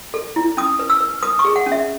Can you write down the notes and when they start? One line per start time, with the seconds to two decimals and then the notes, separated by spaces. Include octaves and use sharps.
0.14 A4
0.36 E4
0.57 C#4 D#6
0.79 B4
0.90 E6
1.01 B4
1.23 B4 D#6
1.39 C#6
1.44 G#4
1.56 F#5
1.66 C#4
1.72 E5